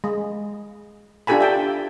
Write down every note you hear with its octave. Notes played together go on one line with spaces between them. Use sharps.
G#3
D4 F4 G4 A4 G#5 B5
E5 G5 A5